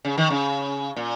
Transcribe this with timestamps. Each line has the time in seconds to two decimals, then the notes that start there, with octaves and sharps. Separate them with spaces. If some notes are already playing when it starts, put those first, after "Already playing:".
0.05 C#3
0.17 D#3
0.30 C#3
0.96 A#2